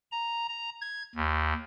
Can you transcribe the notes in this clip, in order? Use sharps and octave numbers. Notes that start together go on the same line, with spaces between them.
A#5
A#5
G#6
D#2